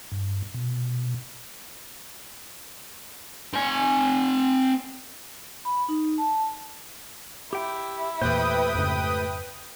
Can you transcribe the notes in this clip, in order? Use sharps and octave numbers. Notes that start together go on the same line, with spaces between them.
G2
B2
C4 G#5
B5
D#4
A5
E4 G4 G5
E2 A#2 A3 G4 B4 C5 G5 D#6
F2 G#2 C#3